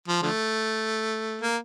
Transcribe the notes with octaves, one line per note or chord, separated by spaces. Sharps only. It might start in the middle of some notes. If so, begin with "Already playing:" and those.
F3
D3 F3 A3
A#3